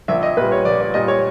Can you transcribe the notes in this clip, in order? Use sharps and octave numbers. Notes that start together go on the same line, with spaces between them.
A#1 E5
D#5
A#2 G3 B4
C#5
A#1 D5
D5
A#2 G3 D#5
C#5